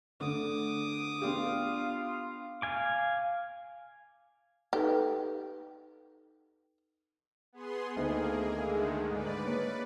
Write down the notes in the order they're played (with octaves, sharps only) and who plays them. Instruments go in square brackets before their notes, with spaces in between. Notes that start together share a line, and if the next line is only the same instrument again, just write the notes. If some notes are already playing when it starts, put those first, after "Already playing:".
[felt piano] D3 A3 D4 [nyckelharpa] D6 D#6
[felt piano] B3 D4 G4 [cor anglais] F4
[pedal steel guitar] F5 G#5 D6
[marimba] D#4 A4 B4 [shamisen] G4
[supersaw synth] B3 G#4 C6
[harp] D2 D#3 D#4 [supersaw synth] A#3 G#4
[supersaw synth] D3 D#3 G#3 [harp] E4
[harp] G#2 [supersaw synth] B4 D5
[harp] A#3 C#5